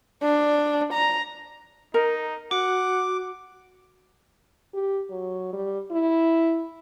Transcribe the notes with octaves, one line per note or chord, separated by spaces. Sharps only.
D4
A#5
D#4 A#4
F#4 F#5 D6
G4
F#3
G3
E4